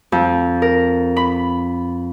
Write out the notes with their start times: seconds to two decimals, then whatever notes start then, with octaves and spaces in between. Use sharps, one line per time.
0.12 F2
0.62 A#4
1.17 B5